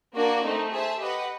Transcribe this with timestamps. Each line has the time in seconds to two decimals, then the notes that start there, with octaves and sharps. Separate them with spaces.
0.15 A#3 D4 F#4 A#4 D5
0.43 A3 C4 D#4
0.72 G#4 C5 E5 A5
0.99 G4 B4 D#5 F#5